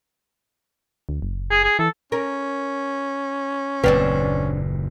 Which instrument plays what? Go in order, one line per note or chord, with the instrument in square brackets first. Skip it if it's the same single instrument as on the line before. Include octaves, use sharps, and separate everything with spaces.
[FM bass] D2
F#1
[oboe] G#4
G#4
[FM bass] E3 [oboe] A4
[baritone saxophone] C#4 [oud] A#4
[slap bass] F#1 D#2 A#2 [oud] C4 D4 G4 [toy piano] B4 F#5